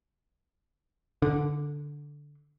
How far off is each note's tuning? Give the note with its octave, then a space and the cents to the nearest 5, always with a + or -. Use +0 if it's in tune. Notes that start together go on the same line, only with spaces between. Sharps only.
D3 -5